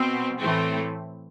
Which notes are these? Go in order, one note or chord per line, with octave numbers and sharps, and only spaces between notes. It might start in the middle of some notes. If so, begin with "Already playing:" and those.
Already playing: B2 C4
A2 E3 A3 C4